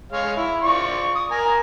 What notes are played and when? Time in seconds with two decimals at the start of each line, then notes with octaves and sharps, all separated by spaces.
0.12 G#3 C#5 F5
0.37 E4
0.63 F4 D5 C#6
1.15 D#6
1.31 A#4 G#5 A#5